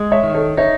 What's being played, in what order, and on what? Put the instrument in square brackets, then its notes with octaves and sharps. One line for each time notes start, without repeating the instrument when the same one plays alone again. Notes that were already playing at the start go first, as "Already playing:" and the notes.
Already playing: [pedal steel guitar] G#3
[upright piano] C#5 E5
[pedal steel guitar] D#3
[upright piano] A4 C#5
[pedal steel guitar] D#4 [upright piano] C#5 E5